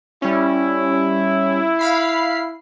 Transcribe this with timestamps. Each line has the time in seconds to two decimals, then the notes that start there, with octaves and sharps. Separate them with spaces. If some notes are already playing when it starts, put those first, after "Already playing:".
0.22 G3 C#4 E4
1.79 F5 B5 C7